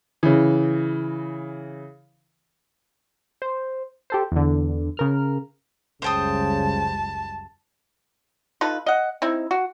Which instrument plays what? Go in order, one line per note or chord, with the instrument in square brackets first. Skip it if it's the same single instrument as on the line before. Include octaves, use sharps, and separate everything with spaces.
[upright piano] C#3 E3
[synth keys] C5
G4 A4 C5
E2 D3
C#3 A#4 F6
[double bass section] F#1 C#2 G3 [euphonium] C#3 [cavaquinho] C5 G5 D#6 [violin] A5
[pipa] D#4 F4 A4 B4
D#5 F#5
C4 D#4 E4
F#4